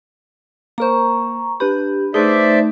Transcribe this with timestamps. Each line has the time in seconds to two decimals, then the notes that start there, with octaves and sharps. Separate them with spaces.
0.78 A#3 A#4 C5 A#5 C#6
1.60 D4 G4 B4 B5
2.14 A3 D#4 G#4 B4 C5 D5 E5